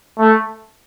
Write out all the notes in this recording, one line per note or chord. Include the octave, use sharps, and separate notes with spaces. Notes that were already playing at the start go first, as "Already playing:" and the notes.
A3